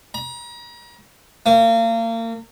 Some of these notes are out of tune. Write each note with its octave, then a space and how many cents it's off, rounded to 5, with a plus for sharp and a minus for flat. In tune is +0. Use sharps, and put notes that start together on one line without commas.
A#5 +40
A#3 -35